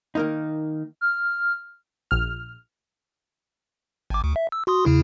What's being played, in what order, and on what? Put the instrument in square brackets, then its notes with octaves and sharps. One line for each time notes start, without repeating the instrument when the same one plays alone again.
[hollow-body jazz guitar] D#3 A#3 D#4
[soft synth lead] F6
[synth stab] A#1 F6
[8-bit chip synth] G#1 D6
D2
E5
E6
F#4 C6 D#6
E2 C#3 E4